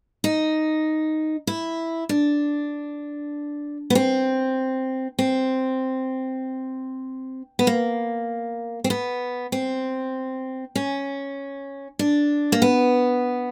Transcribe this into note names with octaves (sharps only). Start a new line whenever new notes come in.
D#4
E4
D4
B3
C4
C4
B3
A#3
C4
B3
C4
C#4
D4
A#3
B3